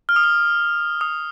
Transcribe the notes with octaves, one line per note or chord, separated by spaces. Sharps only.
F6
D#6
F6
D#6